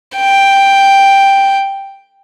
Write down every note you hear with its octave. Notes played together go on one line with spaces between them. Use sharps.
G5